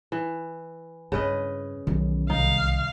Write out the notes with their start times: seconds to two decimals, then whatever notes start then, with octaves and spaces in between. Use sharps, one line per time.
0.12 E3
1.12 G2 C#3 C4 B4 D#5
1.87 B1 D#3 E3
2.30 C2 D#4 F5